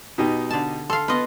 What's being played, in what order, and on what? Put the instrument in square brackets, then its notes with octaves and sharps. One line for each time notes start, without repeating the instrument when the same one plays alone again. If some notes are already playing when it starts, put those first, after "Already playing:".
[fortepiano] B2 D#4 G4
[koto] D3 A5
[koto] A4 F5 [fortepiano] C6
[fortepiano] B3 [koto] F4 D#5